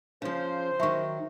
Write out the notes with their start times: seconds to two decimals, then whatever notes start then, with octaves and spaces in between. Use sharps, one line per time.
0.22 C#3 F3 C5
0.80 D#3 F#3 E5 C#6